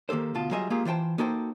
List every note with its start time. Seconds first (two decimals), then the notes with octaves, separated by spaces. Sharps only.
0.09 D#3 A#3 G4 A4 C5
0.35 D2 B2 F4 A5
0.51 F#3 G3 F4 G#4 D#5 E5
0.70 G#3 A#3 F4 G4 G#4
0.85 E3 F4 C5 G5 A5
1.18 A#3 D#4 F#4 A4 C5 G5